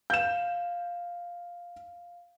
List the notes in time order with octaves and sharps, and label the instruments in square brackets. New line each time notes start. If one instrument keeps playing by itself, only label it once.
[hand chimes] F5 [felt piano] G6 E7